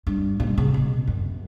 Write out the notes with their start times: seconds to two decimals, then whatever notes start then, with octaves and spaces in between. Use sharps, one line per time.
0.07 G2
0.40 A#2
0.58 C#3
0.74 B2
1.07 F#2